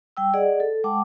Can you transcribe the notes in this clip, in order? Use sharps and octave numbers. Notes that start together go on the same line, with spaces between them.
G3 G5 E6
G#4 D5 D#5 F#5
A4
G#3 F#5 G5 A5 D6